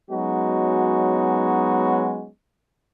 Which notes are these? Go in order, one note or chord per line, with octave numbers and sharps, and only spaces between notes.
F#3 G#3 B3 C#4 D#4 F#4